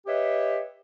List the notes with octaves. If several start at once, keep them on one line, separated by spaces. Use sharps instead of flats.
G4 B4 C#5 D#5 E5